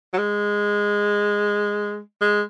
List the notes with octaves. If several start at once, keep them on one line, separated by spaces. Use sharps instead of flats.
F#3
G#3
G#3